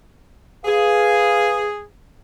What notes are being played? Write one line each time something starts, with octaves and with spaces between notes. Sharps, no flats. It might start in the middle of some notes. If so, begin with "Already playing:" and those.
G#4 B4 F5